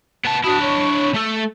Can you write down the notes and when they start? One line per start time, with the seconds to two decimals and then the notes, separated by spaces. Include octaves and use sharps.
0.25 B3 A5
0.44 D4 E4 F#4 A5 D#6
0.61 C#5 C#6
1.14 A3 A4